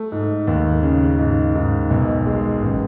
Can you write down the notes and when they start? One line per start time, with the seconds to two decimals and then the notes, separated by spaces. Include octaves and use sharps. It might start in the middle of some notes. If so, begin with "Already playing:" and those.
Already playing: A3
0.12 G#2
0.47 D#2
0.83 C#3
1.19 G#2
1.55 G#2
1.90 B1
2.26 G#3
2.62 A1